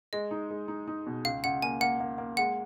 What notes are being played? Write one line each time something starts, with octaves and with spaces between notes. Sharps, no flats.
G#3 D#5
D#4
G#3
D#4
D#4
B2
C#2 F5
C#2 F#5
A#3 G#5
A#3 F#5
A#3
A#3
G#3 F#5